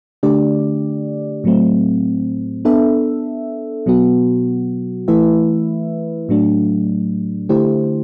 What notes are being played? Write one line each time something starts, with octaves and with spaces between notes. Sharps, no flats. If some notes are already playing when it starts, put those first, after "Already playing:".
D3 A3 D4 G4 D5
A2 F#3 A3 C4
B3 D4 A4 E5
B2 F#3 B3 F#4
E3 A3 E4 B4 E5
A2 F#3 A3 D4
D3 A3 E4 G4 C5